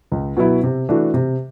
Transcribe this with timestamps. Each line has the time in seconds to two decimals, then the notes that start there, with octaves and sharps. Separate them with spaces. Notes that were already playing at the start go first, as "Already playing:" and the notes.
0.12 C#2
0.37 B2 F#3 B3 E4
0.63 C3
0.89 E3 A3 D4 F#4
1.14 C3